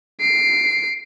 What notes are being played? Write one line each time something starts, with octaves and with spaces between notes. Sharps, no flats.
C7 D7